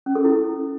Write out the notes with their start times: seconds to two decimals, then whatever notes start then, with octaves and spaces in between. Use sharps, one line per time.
0.06 C#4
0.15 A4
0.25 E4